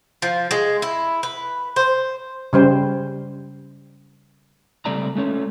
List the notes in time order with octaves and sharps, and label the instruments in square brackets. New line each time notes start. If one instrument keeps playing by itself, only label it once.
[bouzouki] F3
G#3
E4
B4
C5
[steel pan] C#3 G3 C5
[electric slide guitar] C#3 G3 A3 C4 D5 A#5
G#3 A3 C#4 C#5